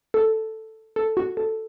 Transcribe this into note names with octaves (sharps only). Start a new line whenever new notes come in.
A4
A4
F#4
A4